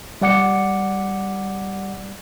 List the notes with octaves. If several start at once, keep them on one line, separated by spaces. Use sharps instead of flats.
G3 D5 F#5 D6 C#7